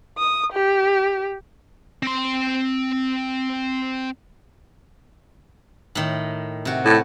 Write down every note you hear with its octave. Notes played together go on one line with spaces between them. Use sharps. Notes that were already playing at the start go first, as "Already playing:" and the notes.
D#6
G4
C4 C6
A2 D#3
C3 F#4
A2